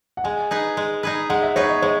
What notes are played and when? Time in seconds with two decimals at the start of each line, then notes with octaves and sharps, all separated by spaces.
0.17 F#5
0.24 G#3 G#5
0.51 D#4 G#4 B4
0.77 G#3
1.03 D#4 G#4 B4
1.30 G#3 F#5
1.43 E5
1.56 D#4 G#4 B4 C#5
1.69 D#5
1.82 G#3 C#5